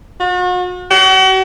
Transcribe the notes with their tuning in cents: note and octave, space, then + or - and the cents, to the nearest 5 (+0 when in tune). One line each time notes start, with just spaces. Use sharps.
F#4 -40
F#4 +40